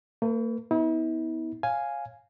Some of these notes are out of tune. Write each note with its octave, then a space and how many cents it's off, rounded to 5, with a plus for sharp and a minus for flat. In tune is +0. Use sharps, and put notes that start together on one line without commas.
A#3 -45 B4 +0
B3 +0 E4 -45
C#5 -10 F5 +0 G#5 +0